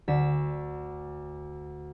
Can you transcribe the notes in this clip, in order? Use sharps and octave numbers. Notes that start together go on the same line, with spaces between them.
D2 B6 E7